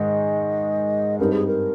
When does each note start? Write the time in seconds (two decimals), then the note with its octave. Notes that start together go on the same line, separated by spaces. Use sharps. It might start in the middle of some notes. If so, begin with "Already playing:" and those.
Already playing: G#2 D#3 G#3 D#5
1.18 G2 G3 C4 D#4 A#4
1.33 G#4
1.47 A#4